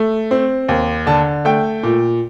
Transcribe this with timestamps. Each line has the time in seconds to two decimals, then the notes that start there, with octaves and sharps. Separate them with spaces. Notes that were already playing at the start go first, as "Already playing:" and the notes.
Already playing: A3
0.31 C4
0.68 D#2
1.06 D3 A5
1.45 A3 G5
1.83 A#2